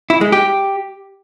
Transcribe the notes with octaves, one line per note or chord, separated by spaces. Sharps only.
E4
G#3
G4